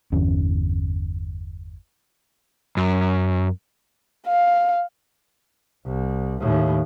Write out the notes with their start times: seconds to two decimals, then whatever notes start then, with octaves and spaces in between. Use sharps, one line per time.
0.12 G1 E2 C#4
2.77 F#2
4.28 F5
5.85 C2
6.41 D#2 A2